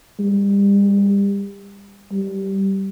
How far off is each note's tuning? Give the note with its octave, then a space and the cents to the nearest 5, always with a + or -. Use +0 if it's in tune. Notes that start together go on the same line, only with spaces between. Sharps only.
G3 +35
G3 -10